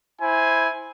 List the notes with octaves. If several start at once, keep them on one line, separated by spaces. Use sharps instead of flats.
E4 C5 G#5